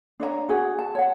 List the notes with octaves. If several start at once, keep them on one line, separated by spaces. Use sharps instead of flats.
D4 C#5 D5 A#5
F#4 G#4 F#5
A5
C#5 F#5